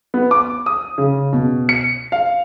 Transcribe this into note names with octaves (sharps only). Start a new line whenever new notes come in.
B3
D6
D#6
C#3
B2
C#7
F5